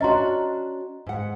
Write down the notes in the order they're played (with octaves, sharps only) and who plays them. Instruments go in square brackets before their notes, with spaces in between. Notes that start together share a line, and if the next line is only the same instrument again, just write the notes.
[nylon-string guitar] C#4 D4 F#4 [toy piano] D#5 A#5 C6
[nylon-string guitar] G#2 F#5